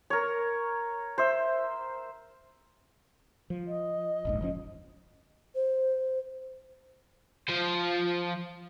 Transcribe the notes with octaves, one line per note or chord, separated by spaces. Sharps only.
A#4 C#5
C5 E5
F3
D#5
D#1 A#1 G#2
F#1 F3 C#4
C5
F3 C5